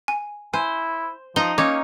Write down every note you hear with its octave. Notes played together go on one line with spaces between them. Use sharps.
G#5
E4 C5 G#5
F3 D#4 A#5 G7
A#3 C#4 D#4 C#5 D6